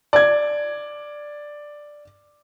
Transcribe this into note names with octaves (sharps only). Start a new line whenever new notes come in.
D5 G#6